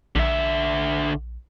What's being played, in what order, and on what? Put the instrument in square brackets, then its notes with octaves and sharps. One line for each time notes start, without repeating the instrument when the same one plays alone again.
[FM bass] A#1 [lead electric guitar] D3 E5